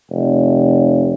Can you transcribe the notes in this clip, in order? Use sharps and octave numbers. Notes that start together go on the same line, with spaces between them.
F1